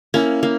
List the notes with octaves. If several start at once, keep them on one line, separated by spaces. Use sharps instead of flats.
A#3 C#4 E4
A#3